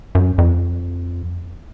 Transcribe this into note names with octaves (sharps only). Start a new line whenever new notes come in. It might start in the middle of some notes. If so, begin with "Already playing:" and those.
F#2
F2